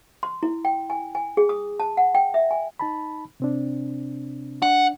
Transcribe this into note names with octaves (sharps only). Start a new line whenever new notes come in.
C6
E4
G5
G#5
G#5
G#4
D#6
A5
F#5
G5
E5
G#5
D#4 A5 B5
C3 C4 D4
D4 F#5